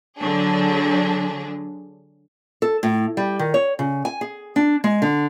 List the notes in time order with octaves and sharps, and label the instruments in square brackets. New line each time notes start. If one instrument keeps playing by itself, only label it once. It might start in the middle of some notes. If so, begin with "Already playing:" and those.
[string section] D3 F#3 D4 G#4
[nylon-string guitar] A4
A2
G3
D#3
C#5
C#3
G#5
G#4
D4
G#3
D3